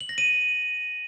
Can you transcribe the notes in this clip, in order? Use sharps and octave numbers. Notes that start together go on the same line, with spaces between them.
F#7
A#6
D#7